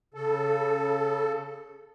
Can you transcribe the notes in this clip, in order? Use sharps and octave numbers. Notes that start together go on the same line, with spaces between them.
C#3 A4